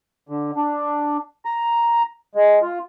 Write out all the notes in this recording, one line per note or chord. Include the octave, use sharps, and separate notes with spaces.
D3
D4
A#5
G#3
F4